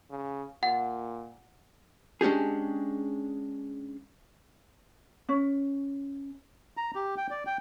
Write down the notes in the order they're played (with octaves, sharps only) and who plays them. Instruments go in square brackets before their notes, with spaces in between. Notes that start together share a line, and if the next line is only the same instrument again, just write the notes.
[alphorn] C#3
[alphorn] A#2 [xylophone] F#5
[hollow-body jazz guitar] G#3 C#4 D4 G4 G#4
[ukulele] C#4
[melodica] A#5
G4
G5
D5
G5